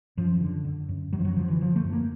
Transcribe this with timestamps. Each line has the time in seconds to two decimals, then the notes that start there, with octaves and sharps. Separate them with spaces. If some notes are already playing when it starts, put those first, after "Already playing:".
0.17 F#2 F3
0.41 D3
0.65 D3
0.89 F#2
1.13 F#2 F#3
1.19 F3
1.25 F#3
1.36 D3 F3
1.48 E3
1.61 D3 F3
1.76 A3
1.85 F#2
1.92 A#3